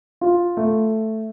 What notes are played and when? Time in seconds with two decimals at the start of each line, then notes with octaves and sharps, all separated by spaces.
0.21 F4
0.57 A3